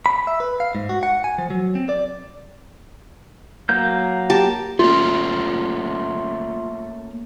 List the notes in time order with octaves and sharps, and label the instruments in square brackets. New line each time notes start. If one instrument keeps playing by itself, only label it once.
[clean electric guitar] B5
E5
B4
F5
G#2
F#4
F#5
G#5
F3
F#3
C4
D5
[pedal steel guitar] F#3 A#3 G6
[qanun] G4 A5
[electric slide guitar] A3 A#3 C#4 [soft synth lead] F4